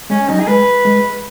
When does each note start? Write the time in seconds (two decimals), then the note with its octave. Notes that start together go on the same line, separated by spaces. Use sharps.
0.10 G#3 C#4
0.29 F#3 D#4
0.40 G#4
0.47 G#3 B4
0.85 G#3